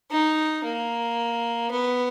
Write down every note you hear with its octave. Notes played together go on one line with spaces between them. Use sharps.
D#4
A#3
B3